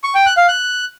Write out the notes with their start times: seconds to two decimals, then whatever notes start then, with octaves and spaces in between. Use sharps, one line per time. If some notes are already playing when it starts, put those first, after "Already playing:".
0.04 C#6
0.15 G5
0.26 F#6
0.37 F5
0.48 F#6